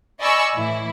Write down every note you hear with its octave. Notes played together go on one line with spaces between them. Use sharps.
D5 D#5 G#5 B5 C#6 E6
A2 E3 E4